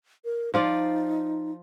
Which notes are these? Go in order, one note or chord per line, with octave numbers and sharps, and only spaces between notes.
A#4
F3 D#4 F4 D5